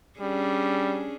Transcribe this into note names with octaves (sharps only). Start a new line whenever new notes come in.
G3 C#4 D4 G#4